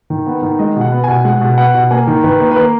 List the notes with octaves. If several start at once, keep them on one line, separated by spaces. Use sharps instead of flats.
D#3
B3
D#3
G#3 D#5
B2
F#5
B3
B2 G#5
G#3 F#5
B2
B3 F#5
B2
A#3 G#5
D#3
D#3 B4
A#3
B4
A#3 A#4